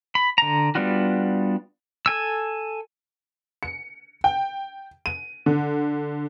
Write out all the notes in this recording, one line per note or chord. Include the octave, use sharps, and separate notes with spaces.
B5
D3 A#5
G3 B3 D4 F4 F#4
A4 G#5 E6
C#7
G5
D#7
D3